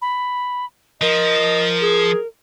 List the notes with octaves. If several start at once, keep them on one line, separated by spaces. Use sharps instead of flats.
B5
F3 A#4 D#5
G#4